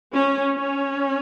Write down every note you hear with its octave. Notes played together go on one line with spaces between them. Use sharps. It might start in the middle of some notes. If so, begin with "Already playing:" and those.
C#4
C#4